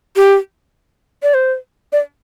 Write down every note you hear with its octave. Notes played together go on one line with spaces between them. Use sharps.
G4
D5
C5
D5